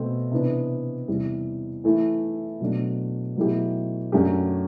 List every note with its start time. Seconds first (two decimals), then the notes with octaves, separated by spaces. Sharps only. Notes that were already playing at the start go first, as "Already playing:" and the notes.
Already playing: B2 A3 C4
0.31 C3 E3 B3 D4
1.07 E2 C3 G3
1.84 E3 A3 E4
2.60 B2 F#3 A3 D4
3.36 B2 F#3 A3 E4 G4
4.12 F#2 F#3 A3 D4 G4